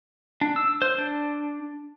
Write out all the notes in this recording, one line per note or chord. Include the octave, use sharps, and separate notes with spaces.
D4
E6
C5
D4